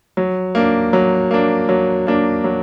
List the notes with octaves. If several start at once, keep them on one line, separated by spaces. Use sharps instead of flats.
F#3
A#3 D4
F#3
A#3 D4
F#3
A#3 D4
F#3